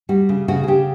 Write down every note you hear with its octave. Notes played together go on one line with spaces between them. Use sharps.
G3 F#4
C#3
C#3 F#4
G#4
C#3 G4